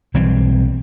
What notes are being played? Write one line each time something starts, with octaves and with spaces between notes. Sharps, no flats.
B1 E3 G3 C4